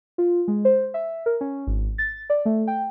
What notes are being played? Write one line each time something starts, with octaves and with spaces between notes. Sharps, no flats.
F4
G#3
C5
E5
A#4
C#4
G#1
A6
D5
A3
G5